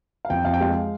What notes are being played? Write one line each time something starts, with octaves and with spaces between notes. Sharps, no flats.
F5
F2 G5
F2 F5
G5
G#3 F5